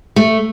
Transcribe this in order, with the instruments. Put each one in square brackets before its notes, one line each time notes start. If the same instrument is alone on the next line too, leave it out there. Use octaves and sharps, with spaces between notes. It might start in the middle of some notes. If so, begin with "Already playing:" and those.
[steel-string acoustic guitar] A3